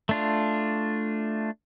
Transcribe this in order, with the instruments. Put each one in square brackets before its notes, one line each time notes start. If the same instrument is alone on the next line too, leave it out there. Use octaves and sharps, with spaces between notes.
[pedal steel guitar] A3 D4 F4